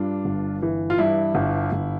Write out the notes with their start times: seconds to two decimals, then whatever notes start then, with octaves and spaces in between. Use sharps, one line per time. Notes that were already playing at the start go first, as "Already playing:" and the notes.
Already playing: G2 D4 F4
0.25 G1
0.62 E3
0.90 F4
0.98 G2 E4
1.35 G1
1.72 G1